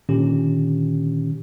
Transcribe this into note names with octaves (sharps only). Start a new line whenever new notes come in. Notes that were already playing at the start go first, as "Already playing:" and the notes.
A#2 D3 D#3 C#4 G4